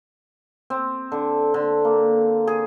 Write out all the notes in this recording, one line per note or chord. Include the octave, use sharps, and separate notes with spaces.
C4
D3
D3
A#3
G#4